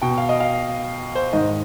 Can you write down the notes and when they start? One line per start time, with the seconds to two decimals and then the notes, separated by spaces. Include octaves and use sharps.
0.02 B2 G5
0.18 F5
0.29 D#5
0.41 F5
1.15 C5
1.33 G#2 D#3 D#5